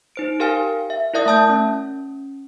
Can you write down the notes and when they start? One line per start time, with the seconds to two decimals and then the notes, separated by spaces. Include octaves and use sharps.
0.16 D#4 C5 D7
0.40 G4 A#4 F5 G5 G#5 F6
0.90 E5
1.14 E4 A#4 D5 E5 D#6
1.26 A3 E5 A5 D#6 G6
1.50 C#4